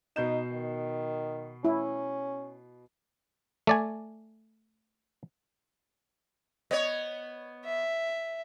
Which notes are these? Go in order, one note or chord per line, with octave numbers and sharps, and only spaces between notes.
B2 D#4 G6 E7
D#3
C#4 E4
A3 D5 G#5
B3 C#5 D#5
E5